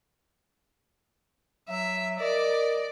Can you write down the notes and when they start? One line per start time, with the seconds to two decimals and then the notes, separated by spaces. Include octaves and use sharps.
1.69 F#3 E5
2.20 A#4 D5 D#5